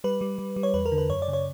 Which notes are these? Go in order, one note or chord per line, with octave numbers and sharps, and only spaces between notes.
G3 B4
G3
G3
G3
C#5
E2 B4
A#4
D3
B4
F#2 C#5
D5
C#3
C#5